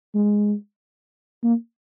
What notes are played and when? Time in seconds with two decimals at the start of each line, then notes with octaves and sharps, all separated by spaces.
0.15 G#3
1.44 A#3